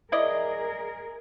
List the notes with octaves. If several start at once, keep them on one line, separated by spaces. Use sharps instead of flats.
E4 G#4 A#4 D5 D#5